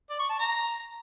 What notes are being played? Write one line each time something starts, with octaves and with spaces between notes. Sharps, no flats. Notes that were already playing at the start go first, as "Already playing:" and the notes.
D5
C#6
A5
A#5